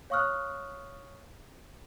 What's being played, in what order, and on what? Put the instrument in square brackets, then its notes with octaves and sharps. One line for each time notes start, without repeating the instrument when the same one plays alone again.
[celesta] C#5 F5 C#6 D#6 F6 F#6